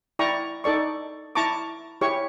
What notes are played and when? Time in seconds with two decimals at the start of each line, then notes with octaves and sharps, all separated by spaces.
0.19 E4 D5 G5 A#5 C#6
0.64 D#4 A4 D5 C#6
1.35 E4 A5 A#5 C#6 D6
2.01 E4 G4 C#5 C#6